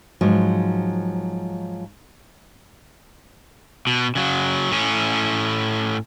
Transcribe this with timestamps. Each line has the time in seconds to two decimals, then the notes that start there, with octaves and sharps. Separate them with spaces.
0.21 G#2 F3 F#3
3.87 B2
4.15 C#3 F#3
4.71 A2 C#4